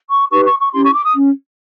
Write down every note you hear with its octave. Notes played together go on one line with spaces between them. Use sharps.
C#6
D#4 G4 B4 C#6
C#6
C#6
C#4 E4 G4 C6
C#6
D6
D#6
C#4